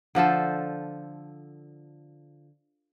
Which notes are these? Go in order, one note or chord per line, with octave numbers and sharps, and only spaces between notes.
D3 F3 A4 C5